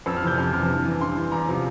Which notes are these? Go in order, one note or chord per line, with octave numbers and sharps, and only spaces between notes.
F2 E6
F6
C3 E3 G6
F2 F6
C3 F6
E3
G2
E3
G2 C6
E3
E2 A#5
C3 F3